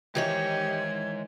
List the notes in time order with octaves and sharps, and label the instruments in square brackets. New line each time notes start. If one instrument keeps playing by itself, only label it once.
[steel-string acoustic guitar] D#3 E3 C#5 [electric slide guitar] G#3 C5 D#5 [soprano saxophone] G4 [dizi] G#6